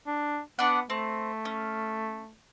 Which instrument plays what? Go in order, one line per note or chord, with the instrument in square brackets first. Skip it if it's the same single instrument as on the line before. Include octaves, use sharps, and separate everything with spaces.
[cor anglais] D4
[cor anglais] B3 [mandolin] D4 D5 F#5
[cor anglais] A3 [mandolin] C4
[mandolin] C#4